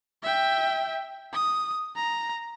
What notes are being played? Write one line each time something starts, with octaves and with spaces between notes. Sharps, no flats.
E5 G5
D#6
A#5